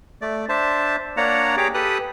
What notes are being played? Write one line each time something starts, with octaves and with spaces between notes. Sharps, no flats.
A3 D5
D4 C5 E5 A5
A#3 D4 C#5 D5 F#5 A#5
G4 G#4 C#5 A#5 D6
G4 A4 B4 D#6 F#6